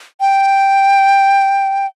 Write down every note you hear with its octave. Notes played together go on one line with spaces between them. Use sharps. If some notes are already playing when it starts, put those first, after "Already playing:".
G5